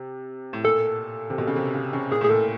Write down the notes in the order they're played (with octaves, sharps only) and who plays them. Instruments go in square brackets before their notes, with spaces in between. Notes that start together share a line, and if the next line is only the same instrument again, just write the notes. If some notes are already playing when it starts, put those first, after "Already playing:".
Already playing: [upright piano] C3
A2
[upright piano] A#2 [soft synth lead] A4
[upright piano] C3
B2
C#3
C3
C#3
C#3
[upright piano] A#2 [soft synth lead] G#4
[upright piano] A2 [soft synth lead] G#4
[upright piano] A#2 [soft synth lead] A4